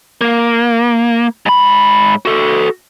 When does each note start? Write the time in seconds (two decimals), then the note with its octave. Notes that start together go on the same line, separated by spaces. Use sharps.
0.21 A#3
1.46 G#2 B5
2.25 F#4 A4